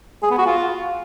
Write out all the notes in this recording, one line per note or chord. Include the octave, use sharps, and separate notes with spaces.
G#4
B3
F#4
F4